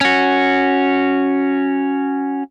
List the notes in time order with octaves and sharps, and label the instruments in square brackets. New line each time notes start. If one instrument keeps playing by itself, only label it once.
[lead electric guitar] C#4 F#4